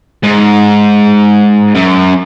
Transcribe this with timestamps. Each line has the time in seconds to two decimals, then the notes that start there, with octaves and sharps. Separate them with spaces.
0.23 G#2
1.75 F#2